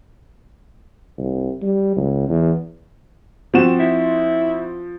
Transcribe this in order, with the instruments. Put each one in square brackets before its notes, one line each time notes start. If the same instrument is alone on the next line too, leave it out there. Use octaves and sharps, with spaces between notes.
[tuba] C2
G3
C#2
E2
[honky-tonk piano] F3 E7 [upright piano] C4 F#4
[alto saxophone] E4